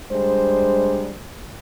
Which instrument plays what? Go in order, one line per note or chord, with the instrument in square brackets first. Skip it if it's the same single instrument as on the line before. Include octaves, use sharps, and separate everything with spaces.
[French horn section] G3 G#3 D4 C5